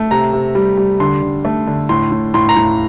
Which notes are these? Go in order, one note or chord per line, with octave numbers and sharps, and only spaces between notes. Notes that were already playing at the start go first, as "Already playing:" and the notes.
Already playing: A3
C3 A#5
C3
G3
G3
D3 C6
D3
A3
D3
A2 C6
A2
A2 C6
A#5
A2